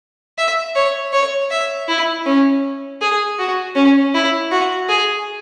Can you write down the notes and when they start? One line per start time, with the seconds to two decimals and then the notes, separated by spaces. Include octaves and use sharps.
0.38 E5
0.76 C#5
1.13 C#5
1.51 E5
1.88 E4
2.26 C#4
3.02 G#4
3.39 F#4
3.75 C#4
4.14 E4
4.51 F#4
4.89 G#4